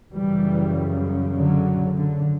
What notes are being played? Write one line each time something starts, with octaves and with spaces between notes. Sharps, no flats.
F#2 C#3 E3 G3
D3 F#3
D3